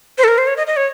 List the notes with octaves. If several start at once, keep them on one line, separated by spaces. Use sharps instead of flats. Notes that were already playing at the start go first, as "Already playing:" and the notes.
C5
A4
A#4
C5
C#5
D#5
D#5
C#5